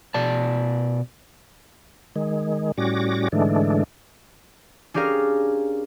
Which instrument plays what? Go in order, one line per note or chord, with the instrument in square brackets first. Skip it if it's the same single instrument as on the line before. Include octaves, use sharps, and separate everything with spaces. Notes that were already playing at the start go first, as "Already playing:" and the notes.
[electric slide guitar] B2 D5 A5
[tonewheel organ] D#3 G#3
A2 G3 C#4 F#4 D6 A#6
G#2 D3 E3 G#3 A3 D4
[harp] C#4 D4 G4 G#4 A#4 F5